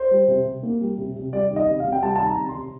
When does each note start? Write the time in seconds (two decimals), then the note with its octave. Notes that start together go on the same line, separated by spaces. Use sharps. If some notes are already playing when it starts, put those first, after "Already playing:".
Already playing: C5
0.11 G3
0.28 C3
0.45 C3
0.63 A#3
0.81 G3
0.98 C3
1.16 C3
1.33 G3 D5
1.51 D#3
1.56 D#5
1.67 C3
1.80 F5
1.85 C3
1.92 G5
2.02 G3 A5
2.16 D#3 A5
2.26 A#5
2.38 C3
2.49 C6
2.55 C3